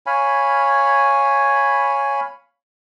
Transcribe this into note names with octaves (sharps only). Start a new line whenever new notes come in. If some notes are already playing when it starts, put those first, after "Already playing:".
C#5 F5 G#5 B5